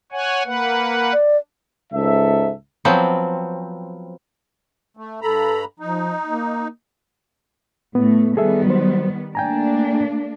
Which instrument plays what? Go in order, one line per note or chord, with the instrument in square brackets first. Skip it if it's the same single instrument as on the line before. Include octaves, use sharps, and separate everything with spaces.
[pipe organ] C#5 F#5 G#5
A#3 B4 F#5
[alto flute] D5
[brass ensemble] C#2 G#2 A4 E5
[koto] F3 F#3 B3 C4
[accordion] A3
[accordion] G2 A#5 B5 [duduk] A4
[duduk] F3 [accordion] D#4
[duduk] A#3
[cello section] A2 A3 [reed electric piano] B3
[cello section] D#3 G3 B3 [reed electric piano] G#4 A4 E5
[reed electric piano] F#3 C5
[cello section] A3 A#3 D4 [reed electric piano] G5 G#5 A#5